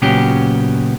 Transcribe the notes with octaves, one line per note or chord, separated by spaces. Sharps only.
A#2 C#3 F#3 B3 C#4 G4